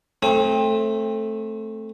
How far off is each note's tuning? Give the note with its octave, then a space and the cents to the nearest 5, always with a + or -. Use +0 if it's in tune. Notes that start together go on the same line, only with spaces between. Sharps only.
A3 +0 C4 +20 D#6 +40